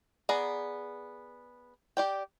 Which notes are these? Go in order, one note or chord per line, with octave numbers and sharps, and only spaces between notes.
B3 G#4 D5 A#5
G4 D5 G5